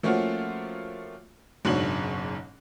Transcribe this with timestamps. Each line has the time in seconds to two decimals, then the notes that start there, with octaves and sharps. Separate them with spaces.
0.03 F3 A3 A#3 C#4 F4 F#4
1.65 F#1 G#2 B2 D4 C#5 F#7